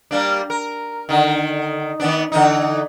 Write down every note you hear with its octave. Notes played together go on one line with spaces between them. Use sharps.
G3 A#3 D4
A#4
D3 D#3
D#3 B3 D4
D3 E3 D#4